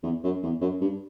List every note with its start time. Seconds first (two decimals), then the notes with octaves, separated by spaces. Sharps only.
0.03 E2
0.24 F#2
0.43 E2
0.61 F#2
0.81 G2